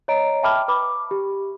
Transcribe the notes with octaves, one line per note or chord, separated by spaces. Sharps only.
C#5 D#5 A#5 D7
E5 G5 A5 B5 D6 F6
B4 B5 D6
G4